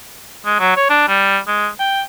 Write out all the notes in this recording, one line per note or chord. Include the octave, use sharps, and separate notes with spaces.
G#3
F#3
C#5
D4
G3
G#3
G5